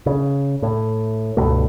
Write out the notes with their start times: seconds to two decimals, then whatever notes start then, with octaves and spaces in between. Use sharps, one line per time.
0.06 C#3
0.62 A2
1.37 C#2 G2 B2 A3